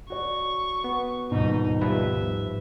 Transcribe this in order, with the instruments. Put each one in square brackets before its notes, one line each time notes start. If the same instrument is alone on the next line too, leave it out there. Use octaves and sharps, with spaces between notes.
[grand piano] F#4 C#5 D5 [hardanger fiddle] C#6
[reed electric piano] B3
[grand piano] D#1 B2 [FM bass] G#2 [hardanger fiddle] D#4
[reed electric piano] F3 G3 B4 [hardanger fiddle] E5